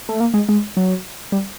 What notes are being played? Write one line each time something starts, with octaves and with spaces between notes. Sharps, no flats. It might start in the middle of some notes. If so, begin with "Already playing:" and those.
A3
A#3
G#3
G#3
F#3
G3